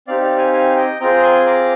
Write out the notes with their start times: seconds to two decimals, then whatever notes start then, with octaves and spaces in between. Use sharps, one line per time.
0.07 C4 D#4 G4 D5 F5
0.22 D5 F5
0.38 F5 G#5
0.53 F5 G#5
0.76 D#5 G5
1.00 C4 F4 G#4 G5 A#5
1.23 G#5 C6
1.46 A#5 D6